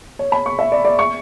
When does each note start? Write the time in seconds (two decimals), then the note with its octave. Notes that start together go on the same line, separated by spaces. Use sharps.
0.19 C#5
0.32 B5
0.46 C#6
0.59 E5
0.72 D5
0.85 D5
0.99 C#6